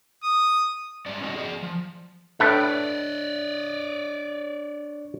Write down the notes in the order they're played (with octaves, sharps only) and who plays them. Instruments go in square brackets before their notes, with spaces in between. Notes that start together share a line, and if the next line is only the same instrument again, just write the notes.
[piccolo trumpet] D#6
[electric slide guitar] G#2 G3 C#4 D5
C#4 D#4 F#4 D#5
G#4 D5
F3
[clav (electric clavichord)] A2 A4 B4 [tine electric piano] D4 F#6 [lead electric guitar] C#5 D5